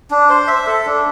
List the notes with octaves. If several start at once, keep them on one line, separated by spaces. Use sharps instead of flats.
D4
C5
E5
A4
D4